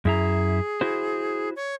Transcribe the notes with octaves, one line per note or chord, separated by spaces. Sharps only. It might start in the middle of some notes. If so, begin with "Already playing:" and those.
F#2 E4 G#4 A#5
E4 F#4 C5
C#5